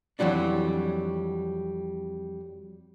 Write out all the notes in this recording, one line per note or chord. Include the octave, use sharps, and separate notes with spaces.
F2 E3 F#3 G3 D4